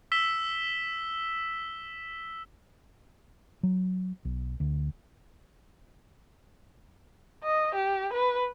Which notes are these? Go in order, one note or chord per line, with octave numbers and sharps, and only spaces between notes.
E6 B6 E7 G7
F#3
B1
D2
D#5
G4
B4